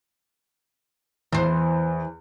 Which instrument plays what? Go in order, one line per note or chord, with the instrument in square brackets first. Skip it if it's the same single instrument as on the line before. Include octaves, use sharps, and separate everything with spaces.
[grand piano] E2 [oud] E3 C5